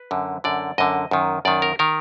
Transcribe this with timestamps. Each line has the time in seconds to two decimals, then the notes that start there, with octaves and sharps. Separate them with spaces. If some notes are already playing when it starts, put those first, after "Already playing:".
Already playing: B4
0.11 F#2 D3
0.44 F#2 D3 D5
0.78 F#2 D3 D#5
1.11 F#2 D#3
1.45 F#2 D#3 D5
1.62 A#4
1.79 D#3 A#4